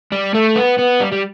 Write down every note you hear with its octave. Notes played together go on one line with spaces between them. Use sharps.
G3
A3
B3
B3
G3
G3